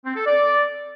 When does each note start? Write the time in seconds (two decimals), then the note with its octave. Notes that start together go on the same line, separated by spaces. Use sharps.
0.05 C4
0.15 A4
0.26 D5